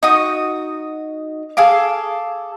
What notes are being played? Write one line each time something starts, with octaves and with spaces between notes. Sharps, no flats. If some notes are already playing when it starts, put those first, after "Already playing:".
D#4 F#4 D#6
G#4 A4 F5 D6